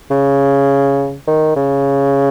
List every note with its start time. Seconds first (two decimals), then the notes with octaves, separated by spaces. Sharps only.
0.10 C#3
1.27 D#3
1.56 C#3